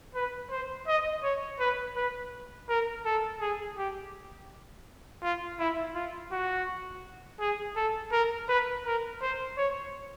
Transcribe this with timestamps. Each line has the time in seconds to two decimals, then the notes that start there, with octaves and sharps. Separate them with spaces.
0.15 B4
0.51 C5
0.87 D#5
1.23 C#5
1.60 B4
1.96 B4
2.69 A#4
3.05 A4
3.40 G#4
3.78 G4
5.23 F4
5.59 E4
5.95 F4
6.32 F#4
7.40 G#4
7.76 A4
8.12 A#4
8.49 B4
8.86 A#4
9.21 C5
9.57 C#5